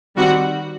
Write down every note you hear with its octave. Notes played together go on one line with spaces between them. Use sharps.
D#3 G3 C4 F#4